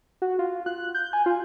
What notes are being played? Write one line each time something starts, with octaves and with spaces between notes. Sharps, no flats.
F#4
F4
F#6
G6
G#5
F4